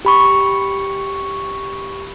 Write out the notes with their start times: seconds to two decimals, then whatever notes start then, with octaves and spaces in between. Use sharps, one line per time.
0.05 G4 B5 C#6